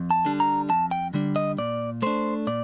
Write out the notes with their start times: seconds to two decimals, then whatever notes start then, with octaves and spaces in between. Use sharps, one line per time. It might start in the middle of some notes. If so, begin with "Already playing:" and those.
Already playing: F2
0.11 A5
0.25 D3 G3 D4
0.40 A#5
0.69 F2 A5
0.91 G5
1.14 D3 G3 D4
1.36 D#5
1.58 A#2 D5
2.02 A3 D4 C5
2.47 A#2 D5